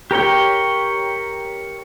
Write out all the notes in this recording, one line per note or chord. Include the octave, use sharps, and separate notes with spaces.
G4 A#4 C#5 G5